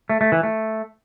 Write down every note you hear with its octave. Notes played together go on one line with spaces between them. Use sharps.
A3
A3
E3
A3